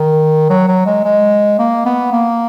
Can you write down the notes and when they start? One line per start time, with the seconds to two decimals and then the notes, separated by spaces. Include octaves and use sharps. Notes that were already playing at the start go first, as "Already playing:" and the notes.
Already playing: D#3
0.50 F#3
0.68 F#3
0.86 G#3
1.04 G#3
1.59 A#3
1.85 B3
2.12 A#3